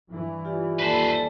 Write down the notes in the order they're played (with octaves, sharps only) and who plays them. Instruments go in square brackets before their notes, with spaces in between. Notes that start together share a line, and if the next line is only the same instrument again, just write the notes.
[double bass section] G2 E3
[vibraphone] F4 G4 D5
[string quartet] D#2 G3 A4 [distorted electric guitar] B4 C5